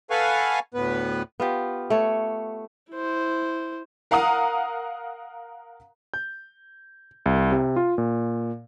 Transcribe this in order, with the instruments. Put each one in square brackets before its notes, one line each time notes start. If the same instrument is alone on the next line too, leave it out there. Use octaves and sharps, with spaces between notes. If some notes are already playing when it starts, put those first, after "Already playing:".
[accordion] A4 B4 F5 F#5 G#5 C#6
D2 A2 B3 B4
[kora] B3 F4 G4
A3 C#5
[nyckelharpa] E4 C5
[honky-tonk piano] A#4 F5 F#5 A#5 D#6
[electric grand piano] G6
C2
C3
F4
A#2